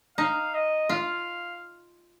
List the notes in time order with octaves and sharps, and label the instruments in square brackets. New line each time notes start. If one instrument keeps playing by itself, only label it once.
[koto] D#4 [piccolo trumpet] F5
[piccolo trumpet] D#5
[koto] F4 [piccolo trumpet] F5